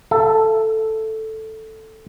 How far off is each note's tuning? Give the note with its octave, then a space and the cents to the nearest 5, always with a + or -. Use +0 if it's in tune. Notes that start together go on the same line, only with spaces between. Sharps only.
A4 +0 E5 +40